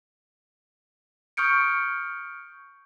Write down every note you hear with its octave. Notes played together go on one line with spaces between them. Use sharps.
C#6 D#6 F6 G6 C#7 D7